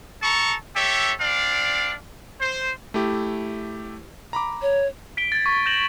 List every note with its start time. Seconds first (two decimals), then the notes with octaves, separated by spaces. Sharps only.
0.22 A4 A5 A#5 C#6
0.75 G4 A4 C#5 E5
1.20 C4 D4 D5 F5
2.40 C5
2.94 A3 E4 G4
4.33 A#5 B5 D6
4.62 C#5
5.17 B6 D7 G7
5.32 G#6 A6
5.46 C#6
5.66 G6 A#6 E7 F#7